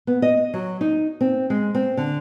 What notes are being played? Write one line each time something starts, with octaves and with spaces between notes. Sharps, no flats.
B3
D#5
F#3
D#4
C4
G#3
C4
D3